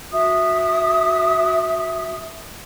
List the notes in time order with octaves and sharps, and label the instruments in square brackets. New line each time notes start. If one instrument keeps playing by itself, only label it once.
[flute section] F#4 E5 D#6